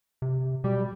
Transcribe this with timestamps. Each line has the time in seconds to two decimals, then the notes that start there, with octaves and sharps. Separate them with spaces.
0.22 C3
0.64 B2 G3